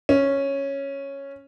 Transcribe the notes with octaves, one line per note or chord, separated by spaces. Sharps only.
C#4